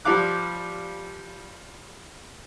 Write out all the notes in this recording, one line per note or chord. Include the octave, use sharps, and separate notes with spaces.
F3 G3 F5 D6 F#6